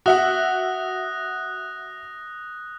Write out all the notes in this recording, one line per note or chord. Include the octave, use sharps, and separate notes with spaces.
F#4 E5 F#5 D#6 F#6 A#6